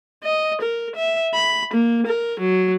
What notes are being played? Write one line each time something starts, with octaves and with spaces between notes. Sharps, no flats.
D#5
A#4
E5
B5
A#3
A#4
F#3